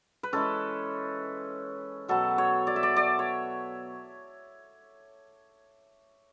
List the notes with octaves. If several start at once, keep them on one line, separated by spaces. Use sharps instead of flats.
B4
E3 G#3 C#4 A4
B2 F#3 B3 A4
C#5
D5
E5
D5
D5
C#5